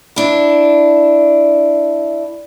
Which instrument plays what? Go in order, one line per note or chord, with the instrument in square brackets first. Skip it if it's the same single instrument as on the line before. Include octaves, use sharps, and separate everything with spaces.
[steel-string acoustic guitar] D4 E4